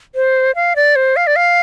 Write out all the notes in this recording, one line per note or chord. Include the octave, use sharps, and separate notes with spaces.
C5
F5
D5
C5
F5
D5
F5